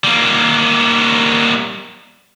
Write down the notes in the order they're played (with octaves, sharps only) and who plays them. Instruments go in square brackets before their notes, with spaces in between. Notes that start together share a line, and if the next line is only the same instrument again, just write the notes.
[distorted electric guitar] G3 A#3